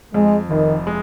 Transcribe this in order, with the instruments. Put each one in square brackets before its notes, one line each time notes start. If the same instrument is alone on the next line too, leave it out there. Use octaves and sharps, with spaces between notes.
[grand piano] F2 [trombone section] G#3
[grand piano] F1 [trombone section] D#3
[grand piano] G#3